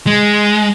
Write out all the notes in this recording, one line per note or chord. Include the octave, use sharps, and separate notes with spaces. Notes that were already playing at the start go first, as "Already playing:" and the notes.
G#3